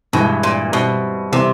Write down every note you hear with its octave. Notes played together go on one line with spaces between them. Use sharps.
G2 B2 E3 G#3
A#2
B2 G3 C4 E4
C3 E3 G3 B3